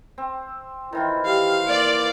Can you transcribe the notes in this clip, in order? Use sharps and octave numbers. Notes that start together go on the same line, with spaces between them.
C4
D#3 E3 E4 F4
G4 F5
A#3 D5